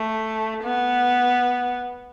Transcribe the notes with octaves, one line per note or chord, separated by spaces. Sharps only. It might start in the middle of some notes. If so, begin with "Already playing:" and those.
Already playing: A3
B3